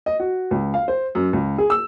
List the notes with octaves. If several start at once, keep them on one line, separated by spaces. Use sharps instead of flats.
D#5
F#4
C#2
F5
C5
F#2
C#2
G#4
E6